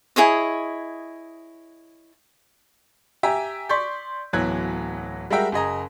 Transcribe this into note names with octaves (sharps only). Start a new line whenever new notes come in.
E4 G#4 C#5 D#5
G4 E5 G5 G#5 A#5
D5 C6 C#6 G6 B6
D1 E3 F#3 B3 F#6 G#6
G3 G#3 F#4 A#4 E5 G5
F#1 G#4 D#5 A#5